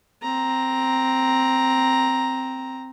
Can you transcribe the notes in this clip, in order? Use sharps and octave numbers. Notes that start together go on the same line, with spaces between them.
C4 A#5